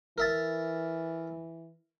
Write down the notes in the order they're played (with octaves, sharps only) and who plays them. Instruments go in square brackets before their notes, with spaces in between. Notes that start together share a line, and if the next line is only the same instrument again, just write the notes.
[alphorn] E3 [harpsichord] A#4 E5 A5